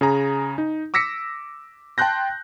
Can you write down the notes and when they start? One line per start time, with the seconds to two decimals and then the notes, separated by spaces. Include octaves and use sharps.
0.01 C#3 G#4 A#5
0.58 D#4
0.94 D6 E6 A#6 B6 C#7
1.98 G5 A5 C6 F#6 G6 A#6